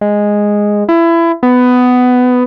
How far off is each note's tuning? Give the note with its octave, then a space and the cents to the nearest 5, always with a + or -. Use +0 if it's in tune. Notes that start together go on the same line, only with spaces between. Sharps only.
G#3 -5
E4 +25
B3 +15